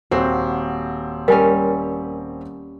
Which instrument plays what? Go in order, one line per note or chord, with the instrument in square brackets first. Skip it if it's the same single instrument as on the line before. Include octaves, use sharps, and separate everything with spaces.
[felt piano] D#1 C4 [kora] F#4 C5
[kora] G3 C#4 [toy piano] A#4 G#5